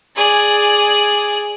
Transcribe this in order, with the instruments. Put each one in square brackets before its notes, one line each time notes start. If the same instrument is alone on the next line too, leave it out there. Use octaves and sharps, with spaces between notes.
[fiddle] G#4 D5